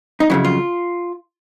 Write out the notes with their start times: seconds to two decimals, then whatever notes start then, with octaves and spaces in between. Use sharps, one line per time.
0.20 D#4
0.30 F2 C#3 F#3 E4
0.45 F4